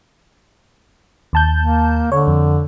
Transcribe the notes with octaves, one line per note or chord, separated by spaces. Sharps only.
D#2 A5 G6
A#3
D3 C#5
F2